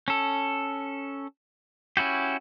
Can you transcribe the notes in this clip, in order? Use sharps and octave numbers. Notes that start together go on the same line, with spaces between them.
C#4 A4
C#4 E4 F#4 G4